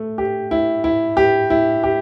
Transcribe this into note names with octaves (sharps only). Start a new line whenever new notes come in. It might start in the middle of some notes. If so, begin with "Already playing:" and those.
Already playing: A3
G4
E4
E4
G4
E4
G4